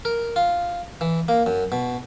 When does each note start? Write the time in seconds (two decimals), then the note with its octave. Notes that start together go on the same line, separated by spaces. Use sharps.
0.05 A#4
0.36 F4
1.01 E3
1.28 A#3
1.46 F#2
1.72 B2